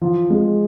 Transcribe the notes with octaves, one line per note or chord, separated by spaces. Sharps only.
F3
G#3